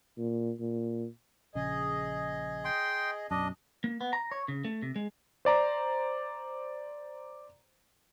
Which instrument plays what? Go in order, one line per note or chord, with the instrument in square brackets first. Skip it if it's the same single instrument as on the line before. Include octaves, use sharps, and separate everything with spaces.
[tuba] A#2
A#2
[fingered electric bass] A#1 C#3 [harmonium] G#4 D#5
[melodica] G5 C6
[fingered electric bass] B1 F#2 [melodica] D4 D#5
[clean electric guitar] A#3
B3
A#5
C#5
C#3
A3
C3
G#3
[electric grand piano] C5 D5 A#5